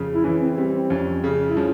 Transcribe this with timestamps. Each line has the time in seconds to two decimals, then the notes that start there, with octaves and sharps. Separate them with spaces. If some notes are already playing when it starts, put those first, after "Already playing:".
Already playing: F2 C#3
0.13 E4
0.24 E3 C#4
0.41 C4
0.57 G3 C4
0.73 C4
0.90 F2 C#4
1.24 C#3
1.48 E4
1.57 F3 C#4